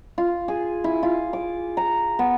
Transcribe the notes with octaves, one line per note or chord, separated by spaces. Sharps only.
F4
G#4
E4
F4
D6
A#5
B3